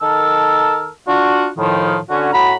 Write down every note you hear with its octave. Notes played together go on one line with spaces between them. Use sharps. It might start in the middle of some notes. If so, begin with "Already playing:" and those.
D#3 A4 A#4 A5 E6
D4 F4 F#4
A2 D#3 F3
D3 C#4 F#4
A2 F#4 A#5 B5